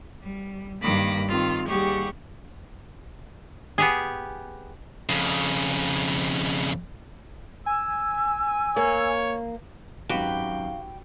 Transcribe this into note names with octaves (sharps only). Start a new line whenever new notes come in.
G3
G2 D#3 A#3 B5 D6 A#6
D#3 C4 F4
D#2 G3 G4 G#4 F#5 C#6
B3 G4 G#4
F2 C#3
G#5 E6
A#3 C#5
G#1 F#2 F#4 G4 B4 F5 G5